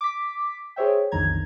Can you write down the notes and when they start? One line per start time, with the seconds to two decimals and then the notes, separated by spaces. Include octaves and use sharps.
0.01 D6 B6
0.76 G#4 C5 C#5 E5 G5
1.12 B1 F2 D3 D#3 A#5 G#6